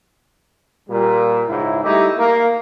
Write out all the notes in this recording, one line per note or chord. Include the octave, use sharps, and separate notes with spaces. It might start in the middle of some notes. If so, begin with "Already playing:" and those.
A#2 G3
C#2 G#2 E4
G3 A3 D#4 E4 G4
A#3